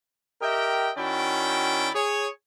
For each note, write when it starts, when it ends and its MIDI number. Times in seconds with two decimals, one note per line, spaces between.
0.42 0.90 67
0.42 0.90 70
0.42 0.90 75
0.42 0.90 76
0.42 0.90 79
0.97 1.89 51
0.97 1.89 61
0.97 1.89 64
0.97 1.89 66
0.97 1.89 74
0.97 1.89 79
1.94 2.27 68
1.94 2.27 73